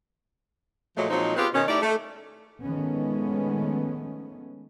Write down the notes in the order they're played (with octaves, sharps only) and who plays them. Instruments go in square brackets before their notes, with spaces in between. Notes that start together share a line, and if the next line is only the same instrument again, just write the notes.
[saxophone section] A#2 F3 F#3 G#3 A3
A#2 F3 F#3 G#3 C4 D#4
B3 C4 F4 G4 G#4 B4
B2 D#3 C#4
A3 D#4 E4 G4 D5
A3
[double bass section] D#3 F3 G#3 A3 B3 C#4